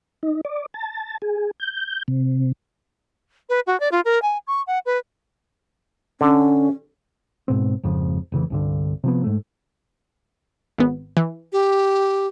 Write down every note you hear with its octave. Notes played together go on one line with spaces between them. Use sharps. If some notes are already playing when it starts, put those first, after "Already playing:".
D#4
D5
A5
G#4
G6
C3
B4
F#4
D5
F4
A#4
G#5
C#6
F#5
B4
D3 C#4
G#2 B2 C4
G#1 F2 C#3 F3
F1 C#3 E3
C2 G2 D3
C3 F3 B3
G#2 A3
G#1 B3
E3
G4